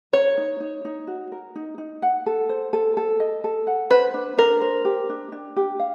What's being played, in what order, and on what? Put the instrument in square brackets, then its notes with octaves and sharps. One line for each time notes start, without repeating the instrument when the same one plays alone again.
[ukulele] A#4 [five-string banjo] C#5
[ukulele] D#4
D#4
D#4
F#4
A#4
D#4
D#4
F#5
A4
C5
A4
A4
D#5
A4
F#5
[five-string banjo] B4 [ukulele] C5
[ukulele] D4
[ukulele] D4 [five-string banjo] A#4
[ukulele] C5
G4
D4
D4
G4
F5